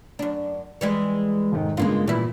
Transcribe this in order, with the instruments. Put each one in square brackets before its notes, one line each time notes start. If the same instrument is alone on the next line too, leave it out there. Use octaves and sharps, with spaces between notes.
[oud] F#2 D4
E3 G3 G#3
[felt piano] F1 G#2 D#3
[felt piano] G2 C#3 [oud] G#3 A#3 F4
[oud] G2 E4 [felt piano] A#2 E3